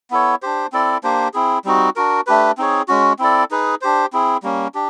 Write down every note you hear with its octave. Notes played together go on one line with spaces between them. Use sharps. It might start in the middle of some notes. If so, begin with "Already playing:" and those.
B3 E4 A4 C#5
D4 G4 C5
C4 E4 A4 D5
A#3 D4 G4 C5
C4 E4 G#4
G3 C4 D#4 F#4
D4 F#4 A#4
A3 D4 G4 B4
C4 D#4 G#4 C#5
G#3 C#4 F#4
C4 E4 A4 D5
D#4 G#4 B4
D4 G4 C5
C4 E4 G#4
G3 A#3 C#4
D4 G4